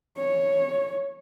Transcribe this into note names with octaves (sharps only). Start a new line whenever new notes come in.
C#5